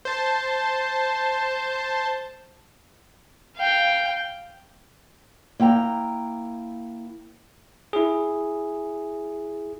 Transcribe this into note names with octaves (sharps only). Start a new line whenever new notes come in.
C5 A5
F5 G5
A#3 E4 G5 A#5
E4 G#4